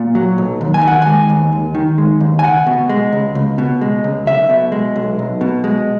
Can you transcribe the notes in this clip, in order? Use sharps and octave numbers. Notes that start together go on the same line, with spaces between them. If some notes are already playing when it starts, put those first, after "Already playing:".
Already playing: A#2
F#3
B1
D#2
G#5
D#3 F#5
G#3 G#5
D#2
D#2
D#3
G#3
D#2
G#5
C#2 F#5
B2
G#3
C#2
C#2
B2
G#3
C#2
B1 E5
B2
G#3
B1
B1
B2
G#3